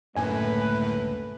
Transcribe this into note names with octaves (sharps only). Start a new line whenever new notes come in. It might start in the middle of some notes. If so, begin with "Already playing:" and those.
C#2 F#2 A2 D3 A3 A#3 B4 G#5